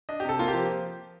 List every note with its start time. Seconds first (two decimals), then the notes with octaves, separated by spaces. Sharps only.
0.09 D4 D#5
0.20 G4
0.24 C3
0.29 A4
0.39 A#3 F4
0.48 G4
0.54 F3